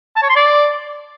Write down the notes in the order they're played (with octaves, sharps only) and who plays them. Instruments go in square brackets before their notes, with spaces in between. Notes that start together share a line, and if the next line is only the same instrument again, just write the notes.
[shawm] A5
C#5
C6
D5